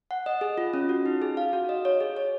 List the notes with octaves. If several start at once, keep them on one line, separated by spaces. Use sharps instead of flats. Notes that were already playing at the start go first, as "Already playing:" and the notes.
F#5
D#5
G#4
F4
C#4
F#4
D#4
G#4
F5
F#4
D#5
C#5
G#4
C#5